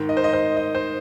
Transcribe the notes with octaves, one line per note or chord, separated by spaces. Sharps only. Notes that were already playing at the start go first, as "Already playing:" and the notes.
Already playing: G#2 D#3
D#5
C5
D#5
C5
D#5
C5